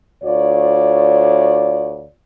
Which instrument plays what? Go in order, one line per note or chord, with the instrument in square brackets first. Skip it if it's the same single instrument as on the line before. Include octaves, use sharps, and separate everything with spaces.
[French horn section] D2 F4 C#5 D5